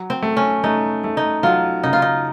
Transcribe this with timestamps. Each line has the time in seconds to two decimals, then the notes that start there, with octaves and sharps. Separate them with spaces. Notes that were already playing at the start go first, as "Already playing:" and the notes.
Already playing: F#3
0.10 C4
0.22 A3
0.37 C#4
0.64 A3 D#4
1.04 A3
1.17 D#4
1.43 F#3 F4
1.83 C#3 D#4
1.93 F4
2.02 D#4